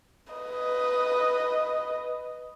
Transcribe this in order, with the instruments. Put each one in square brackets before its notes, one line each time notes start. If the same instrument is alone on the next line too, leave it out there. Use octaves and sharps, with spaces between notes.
[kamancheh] B4 D#5